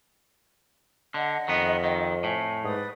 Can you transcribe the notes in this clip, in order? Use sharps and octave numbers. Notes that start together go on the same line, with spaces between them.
D3 D#5 F#5
F2 D#3 B3
D#3
A2 G#5
G#2 B4 D5 D#6